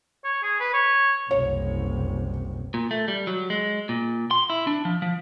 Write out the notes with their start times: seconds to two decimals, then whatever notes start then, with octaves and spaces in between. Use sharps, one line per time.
0.24 C#5
0.43 G#4
0.60 B4
0.74 C#5
1.31 F#1 C2 C#5
2.74 A#2
2.91 A3
3.08 G3
3.27 F#3
3.50 G#3
3.89 A#2
4.31 C6
4.50 E4
4.67 D4
4.85 F3
5.02 F3